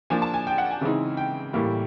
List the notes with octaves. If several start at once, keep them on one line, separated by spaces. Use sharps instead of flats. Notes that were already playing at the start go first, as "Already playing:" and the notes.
F3 A#3 D4 G#5
A5
G#5
G5
F#5
G#5
C#3 E3 G#3 C4 D#4
G5
A2 E3 G3 A#3